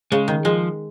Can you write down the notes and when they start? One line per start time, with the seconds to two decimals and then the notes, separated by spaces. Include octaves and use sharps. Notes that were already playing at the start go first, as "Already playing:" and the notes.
0.12 C#3 G#3
0.28 D#3
0.45 F3 G#3